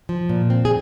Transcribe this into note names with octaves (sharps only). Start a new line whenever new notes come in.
F3
A#2
C4
G#4